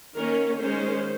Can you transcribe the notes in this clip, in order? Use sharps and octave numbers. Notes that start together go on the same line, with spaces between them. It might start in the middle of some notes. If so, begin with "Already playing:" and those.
D#3 A#3 C#4 A#4
D#3 G#3 C#4 C5